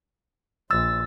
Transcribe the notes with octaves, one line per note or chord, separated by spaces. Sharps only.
A#1 E6 A6